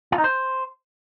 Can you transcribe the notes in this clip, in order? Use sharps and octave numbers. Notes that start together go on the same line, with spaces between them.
F4
D#4
C5